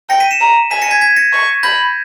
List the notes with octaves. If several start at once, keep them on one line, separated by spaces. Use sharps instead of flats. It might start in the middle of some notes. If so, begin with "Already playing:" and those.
G5 A#6 C#7
B6 D#7
C#7 E7
A#5
G#5 B6 D#7
A#6 C#7
G#6 B6
G#6 B6
A#6 C#7
C#6
B5 G6 A#6